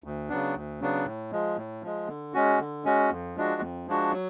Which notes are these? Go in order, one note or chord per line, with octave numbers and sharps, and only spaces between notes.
D2
C#3 F#3 B3 D4
D2
C#3 F#3 B3 D4
A2
F3 G#3
A2
F3 G#3
D3
G#3 C#4 F#4
D3
G#3 C#4 F#4
F2
F3 G#3 D4 F#4
F2
F3 G#3 D4 F#4
F#3